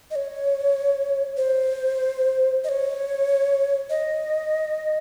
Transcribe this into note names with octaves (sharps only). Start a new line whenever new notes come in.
D#5
C#5
C5
D#5
C#5
D#5